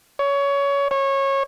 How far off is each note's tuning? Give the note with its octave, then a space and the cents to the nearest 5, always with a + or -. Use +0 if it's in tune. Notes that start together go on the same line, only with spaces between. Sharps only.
C#5 +20
C#5 -20